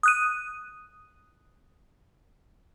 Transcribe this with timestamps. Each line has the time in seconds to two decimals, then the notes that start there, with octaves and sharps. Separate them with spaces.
0.03 D#6 F#6 D#7